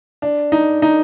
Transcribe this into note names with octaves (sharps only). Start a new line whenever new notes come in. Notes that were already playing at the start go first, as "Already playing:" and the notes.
D4
D#4
D#4